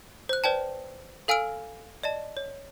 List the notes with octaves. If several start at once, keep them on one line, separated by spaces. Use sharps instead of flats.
C5 F#6
B4 C5 D5 G5 A5
A4 F5 G#5 E6 F6 D7
D5 D#5 A5
C#5